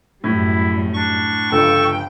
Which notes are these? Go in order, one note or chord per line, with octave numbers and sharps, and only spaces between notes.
F#2 A2 G3 E4
D4 C#6
G1 C#2 G2 A4 G5